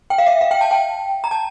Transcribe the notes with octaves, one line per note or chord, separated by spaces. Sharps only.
G5
F5
E5
F5
G5
A5
G5
A#5
A5